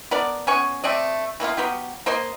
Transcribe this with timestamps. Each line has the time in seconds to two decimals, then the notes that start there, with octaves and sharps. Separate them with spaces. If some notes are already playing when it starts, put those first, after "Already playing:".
0.11 B3 D4 A#4 D5
0.47 B3 C#4 G#5 C#6
0.84 A3 C4 D5 D#5
1.40 E3 A#3 B3 F4
1.57 F#3 B3 F4 G4
2.06 A#3 C5 D#5 C6